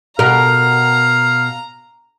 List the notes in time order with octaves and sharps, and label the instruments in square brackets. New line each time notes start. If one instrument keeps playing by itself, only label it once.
[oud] B2 A#4 [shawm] F5 [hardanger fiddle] A#5